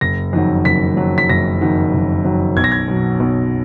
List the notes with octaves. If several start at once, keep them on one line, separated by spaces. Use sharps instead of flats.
F#1 A#6
F2 D#3 F#3
F#1 B6
F2 D#3 F#3
B6
F#1 A#6
F2 D#3 F#3
F#1
F2 D#3 F#3
B1 G#6
A#6
G#6
B2 F#3
B1